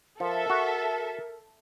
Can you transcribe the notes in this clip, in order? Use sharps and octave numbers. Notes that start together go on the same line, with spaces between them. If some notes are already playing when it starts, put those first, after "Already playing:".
F3 A4 A#4 E5
F#4